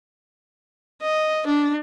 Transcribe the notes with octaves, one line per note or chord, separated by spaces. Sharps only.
D#5
D4